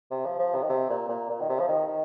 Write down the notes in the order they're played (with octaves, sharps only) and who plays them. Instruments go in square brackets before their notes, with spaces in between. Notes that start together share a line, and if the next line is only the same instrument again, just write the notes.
[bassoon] C3
F3
F3
C3
D#3
C3
A#2
A#2
A#2
D#3
C3
F3
D#3
D#3